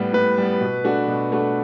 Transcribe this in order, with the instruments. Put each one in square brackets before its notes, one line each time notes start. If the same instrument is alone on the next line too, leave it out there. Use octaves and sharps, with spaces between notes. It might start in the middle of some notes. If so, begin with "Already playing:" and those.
Already playing: [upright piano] A2 G3 B3 [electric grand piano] B4
[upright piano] A2 [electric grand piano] B4
[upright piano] G3 B3
B2
A3 D4 F#4
B2
A3 D4 F#4